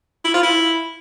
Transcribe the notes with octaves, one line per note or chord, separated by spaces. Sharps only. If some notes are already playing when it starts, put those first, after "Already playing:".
E4
F4
E4